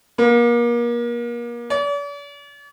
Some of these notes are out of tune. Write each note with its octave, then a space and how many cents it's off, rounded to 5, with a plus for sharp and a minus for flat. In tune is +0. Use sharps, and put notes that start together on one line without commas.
A#3 +35
D5 -45